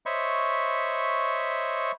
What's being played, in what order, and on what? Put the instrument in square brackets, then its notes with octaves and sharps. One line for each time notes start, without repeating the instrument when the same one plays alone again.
[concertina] C5 C#5 D#5 E5 B5 C#6